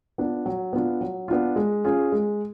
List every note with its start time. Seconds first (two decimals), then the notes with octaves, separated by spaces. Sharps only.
0.18 B3 D4 F4
0.46 F#3
0.73 B3 D4 F4
1.01 F#3
1.28 B3 D4 F4
1.56 G#3
1.85 C#4 F4 G#4
2.12 G#3